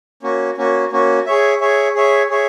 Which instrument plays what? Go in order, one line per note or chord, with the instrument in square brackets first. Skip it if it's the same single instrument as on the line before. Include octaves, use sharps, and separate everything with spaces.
[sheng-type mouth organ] A#3 C#4 F#4
A#3 C#4 F#4
A#3 C#4 F#4
G#4 C#5 E5
G#4 C#5 E5
G#4 C#5 E5
G#4 C#5 E5